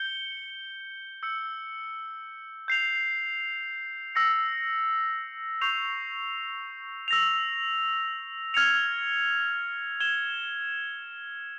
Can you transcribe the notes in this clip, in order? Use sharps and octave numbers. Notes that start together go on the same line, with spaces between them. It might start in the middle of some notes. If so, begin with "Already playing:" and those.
Already playing: G6 C#7 G7
E6 G6 C#7
G6 C7 F7
E6 A#6 C#7
C#6 G6 C7 F7
E6 A#6 F7
F6 G#6 C#7 F7
G#6 E7 G7